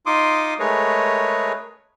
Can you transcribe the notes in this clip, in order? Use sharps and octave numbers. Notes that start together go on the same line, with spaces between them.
D#4 F4 C6 D6 D#6
G#3 A3 G#4 A#4 B4 C#5